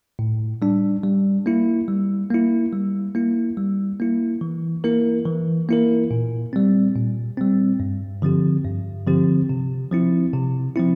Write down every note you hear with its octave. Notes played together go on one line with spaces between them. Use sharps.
A2
G3 D4
G3
A#3 E4
G3
A#3 E4
G3
A#3 E4
G3
A#3 E4
E3
A#3 E4 A#4
E3
A#3 E4 A#4
A#2
G3 C4
A#2
G3 C4
G2
D3 F3 C4 G4
G2
D3 F3 C4 G4
C3
F3 C4 E4
C3
F3 C4 E4